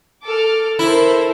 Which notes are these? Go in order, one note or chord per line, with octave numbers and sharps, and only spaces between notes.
A4 D6 F6
E4 A4 A#4 C5